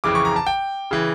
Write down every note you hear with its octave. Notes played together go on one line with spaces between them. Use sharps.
F2 C#3 E3 D6
C#6
A#5
A5
G5
C#3 E3